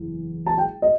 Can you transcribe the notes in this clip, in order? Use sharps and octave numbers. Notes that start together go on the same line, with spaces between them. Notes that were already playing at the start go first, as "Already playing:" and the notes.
Already playing: F#1 E2
A5
G5
D#5